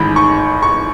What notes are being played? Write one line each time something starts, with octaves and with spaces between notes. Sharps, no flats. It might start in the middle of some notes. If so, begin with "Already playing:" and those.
Already playing: A1 G#2 D#3 B5
C#6
C#6